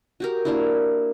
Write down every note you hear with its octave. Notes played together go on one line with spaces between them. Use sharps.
F#4 G4 A#4
A#3 D4 E4